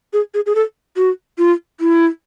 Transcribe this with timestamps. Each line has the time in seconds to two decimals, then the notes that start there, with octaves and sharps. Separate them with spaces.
0.13 G#4
0.34 G#4
0.46 G#4
0.55 A4
0.97 F#4
1.38 F4
1.80 E4